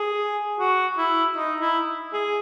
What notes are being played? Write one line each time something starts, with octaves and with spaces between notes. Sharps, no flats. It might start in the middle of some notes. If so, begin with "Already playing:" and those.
Already playing: G#4
F#4
E4
D#4
E4
G#4